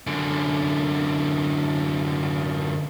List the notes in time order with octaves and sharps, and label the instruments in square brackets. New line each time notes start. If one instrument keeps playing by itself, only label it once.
[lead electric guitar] F#2 D3